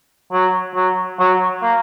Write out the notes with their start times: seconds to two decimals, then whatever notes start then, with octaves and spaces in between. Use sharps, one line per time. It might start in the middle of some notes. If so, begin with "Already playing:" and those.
0.33 F#3
0.75 F#3
1.20 F#3
1.62 A#3